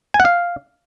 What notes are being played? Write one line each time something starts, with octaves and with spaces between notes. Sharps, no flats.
G#5
F#5
F5